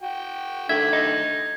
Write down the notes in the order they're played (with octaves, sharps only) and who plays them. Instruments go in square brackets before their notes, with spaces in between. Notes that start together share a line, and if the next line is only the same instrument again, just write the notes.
[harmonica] F#4 G5
[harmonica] D3 D#3 A3 [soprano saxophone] E5 [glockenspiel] G#6
[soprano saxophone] D#4